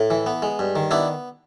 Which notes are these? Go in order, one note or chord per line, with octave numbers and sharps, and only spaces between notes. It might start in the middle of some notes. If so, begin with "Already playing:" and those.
Already playing: A2
E3
B3
G#3
G2
D#3
B3 D4 E4